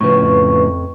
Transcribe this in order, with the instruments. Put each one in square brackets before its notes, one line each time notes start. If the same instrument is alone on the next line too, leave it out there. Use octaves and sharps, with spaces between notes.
[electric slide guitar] A2 C#3 F3 [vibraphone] B4 C#6
[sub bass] F2